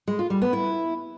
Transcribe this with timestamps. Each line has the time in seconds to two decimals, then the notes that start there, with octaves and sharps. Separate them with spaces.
0.08 G#3
0.19 F4
0.30 G3
0.42 B3
0.53 E4